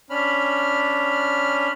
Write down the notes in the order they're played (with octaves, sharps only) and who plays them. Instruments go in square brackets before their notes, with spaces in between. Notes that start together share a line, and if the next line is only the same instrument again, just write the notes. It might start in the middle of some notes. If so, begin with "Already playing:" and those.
[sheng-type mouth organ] C#4 D4 B5 F6